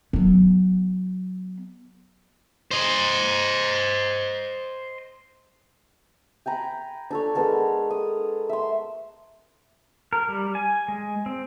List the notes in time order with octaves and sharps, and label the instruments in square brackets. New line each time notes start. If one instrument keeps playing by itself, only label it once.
[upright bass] F#3 B3
[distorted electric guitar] C5 D#5
[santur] G5 G#5 A#5 B5
D4 A4 C#5
G#3 B3 A4 A#4
D#6
E5 C6
[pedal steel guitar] A#4
G3
G#5
G#3
C4